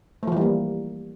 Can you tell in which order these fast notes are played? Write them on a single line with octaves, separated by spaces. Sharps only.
A3 F3 E3 G3 A#3